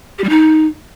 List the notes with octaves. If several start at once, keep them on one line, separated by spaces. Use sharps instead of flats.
G4
G3
D#4